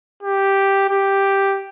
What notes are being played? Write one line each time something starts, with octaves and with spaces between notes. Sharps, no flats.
G4
G4